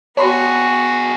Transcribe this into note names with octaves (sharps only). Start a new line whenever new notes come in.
B3 D4 F#4 G#4 C#5 B5 C6